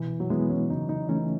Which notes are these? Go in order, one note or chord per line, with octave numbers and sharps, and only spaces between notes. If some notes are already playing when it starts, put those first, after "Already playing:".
Already playing: B2 E3
F#3
E3 G#3 B3 E4
C#4
C#3 D#4
D#4
E3 A3 C#4 D#4